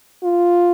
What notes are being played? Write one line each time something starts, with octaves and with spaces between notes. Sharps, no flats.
F4